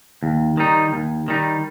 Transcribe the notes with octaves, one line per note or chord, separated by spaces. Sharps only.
D#2
D#3 G3 D#4
D#2
D#3 G3 D#4